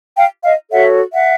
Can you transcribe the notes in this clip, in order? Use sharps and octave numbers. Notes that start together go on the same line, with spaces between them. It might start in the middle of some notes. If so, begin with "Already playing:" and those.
F5 G5
D#5 F5
F#4 A4 C#5 E5 F#5
E5 F#5